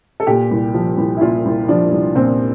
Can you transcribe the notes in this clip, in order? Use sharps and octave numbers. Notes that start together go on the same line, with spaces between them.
A4
A#2 G4
C2
F3
C2
E4
A#2 F4
C2
F3 D4
C2
A#2 C4